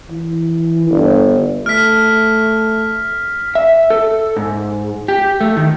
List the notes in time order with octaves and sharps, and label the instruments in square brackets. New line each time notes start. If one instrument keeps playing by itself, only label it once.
[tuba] E3
G1
[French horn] A3 [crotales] F6 B6
[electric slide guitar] E5
A4
G#2
G4
A3
D#3